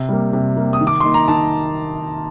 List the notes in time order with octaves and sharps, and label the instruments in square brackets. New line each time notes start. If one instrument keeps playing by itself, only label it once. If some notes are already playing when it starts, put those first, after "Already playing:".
Already playing: [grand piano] C3
G3 A#3
C3
G3 A#3
D#6
D#3
D6
A#3 D#4 C6
A#5
D#3 A5